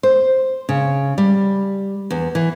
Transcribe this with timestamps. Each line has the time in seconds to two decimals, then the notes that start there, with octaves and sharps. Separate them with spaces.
0.03 C5
0.69 C#3
1.18 G3
2.11 E2
2.35 E3